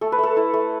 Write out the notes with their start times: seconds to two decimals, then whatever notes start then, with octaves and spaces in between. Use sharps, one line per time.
0.01 A3 A4
0.12 B4
0.19 A3 A4
0.37 E4
0.54 A3